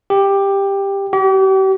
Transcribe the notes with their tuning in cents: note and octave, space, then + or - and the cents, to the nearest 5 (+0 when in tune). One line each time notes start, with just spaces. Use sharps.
G4 +10
G4 -40